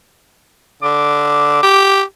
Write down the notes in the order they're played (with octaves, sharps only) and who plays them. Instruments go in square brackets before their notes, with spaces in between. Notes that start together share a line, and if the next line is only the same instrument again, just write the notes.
[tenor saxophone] D3 [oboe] D6
[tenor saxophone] G4